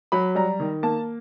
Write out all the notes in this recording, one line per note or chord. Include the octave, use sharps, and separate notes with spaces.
F#3 B5
G3 A#5
D#3
A#3 A5